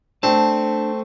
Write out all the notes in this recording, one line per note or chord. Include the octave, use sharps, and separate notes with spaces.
A3 C4 D4 A5